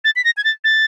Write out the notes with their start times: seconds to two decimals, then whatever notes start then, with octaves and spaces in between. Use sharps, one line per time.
0.04 A6
0.16 B6
0.24 A#6
0.37 G#6
0.44 A6
0.64 A6